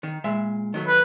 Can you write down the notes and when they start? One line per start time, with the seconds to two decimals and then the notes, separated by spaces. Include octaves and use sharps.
0.03 D#3
0.24 A#2 G#3 E5
0.74 D#3 F#3 A3
0.88 B4